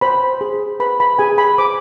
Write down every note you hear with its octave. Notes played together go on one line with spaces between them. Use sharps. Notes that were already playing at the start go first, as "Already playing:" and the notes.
C5 B5
G#4
B4 B5
B5
G#4 G#5
B5
C5 D6